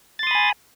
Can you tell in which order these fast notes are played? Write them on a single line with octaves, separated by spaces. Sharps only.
A6 C6 D#6 B5 G#5